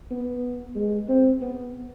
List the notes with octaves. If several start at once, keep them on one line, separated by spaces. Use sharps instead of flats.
B3
G#3
C4
B3